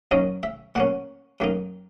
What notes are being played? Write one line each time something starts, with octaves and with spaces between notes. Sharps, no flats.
F#2 D#3 A#3 C#4 D#5
E5
A#2 A#3 C#4 F#5
F#2 D#3 A#3 D#4